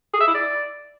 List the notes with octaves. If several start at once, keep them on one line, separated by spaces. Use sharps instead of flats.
G#4
E5
E4
D5